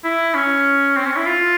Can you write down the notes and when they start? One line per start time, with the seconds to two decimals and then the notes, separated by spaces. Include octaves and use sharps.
0.04 E4
0.35 C#4
0.96 C4
1.06 C#4
1.17 E4
1.26 F4